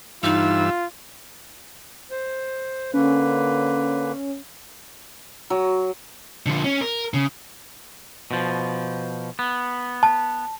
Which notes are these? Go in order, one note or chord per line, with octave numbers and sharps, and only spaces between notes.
G2 E3 D#4 F4 E6
C5
D3 A#3 C#4 B4
F#3
D3 F3
C#4
A#4
C#3
B2 F3
B3
A5